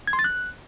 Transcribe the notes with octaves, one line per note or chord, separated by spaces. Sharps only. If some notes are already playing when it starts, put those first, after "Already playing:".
G#6
C6
A6
F#6